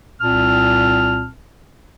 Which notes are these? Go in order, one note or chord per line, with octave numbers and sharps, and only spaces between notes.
C2 A#2 C4 A5 F6